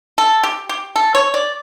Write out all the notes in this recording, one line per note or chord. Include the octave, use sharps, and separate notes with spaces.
A4
G4
G4
A4
C#5
D5